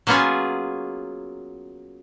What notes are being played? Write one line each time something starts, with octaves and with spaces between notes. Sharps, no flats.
F#3 A#3 B3 C#4 F4 G#4